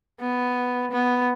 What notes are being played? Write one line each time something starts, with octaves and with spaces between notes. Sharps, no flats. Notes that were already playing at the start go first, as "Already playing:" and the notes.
B3
B3